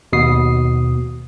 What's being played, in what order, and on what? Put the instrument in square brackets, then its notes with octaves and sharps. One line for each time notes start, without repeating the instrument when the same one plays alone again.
[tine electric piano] D#2 B2 D#6 C7